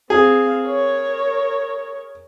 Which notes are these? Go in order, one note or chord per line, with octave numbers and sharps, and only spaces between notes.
C4 G#4 F5
A#4 C#5